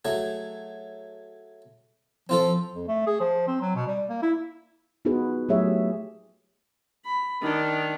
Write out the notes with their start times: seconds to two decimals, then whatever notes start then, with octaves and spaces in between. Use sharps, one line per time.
0.05 F#3 A3 G#4
2.29 F3 C4 F4 A4
2.74 F2
2.88 A3
3.07 G#4
3.20 F3
3.47 C4
3.61 F#3
3.75 B2
3.87 G3
4.10 A#3
4.22 E4
5.05 B3 D#4 F4 F#4 G#4 B4
5.49 F#3 A3 G4 G#4 C#5 E5
7.05 B5
7.42 D#3 D4